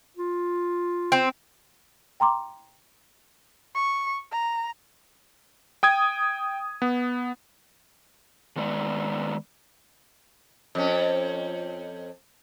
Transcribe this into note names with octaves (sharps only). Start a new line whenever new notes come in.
F4
C4
G5 A#5 C6 D6
C#6
A#5
G5 D#6 G#6
B3
D#3 G#3 B3 D5
F2 C#4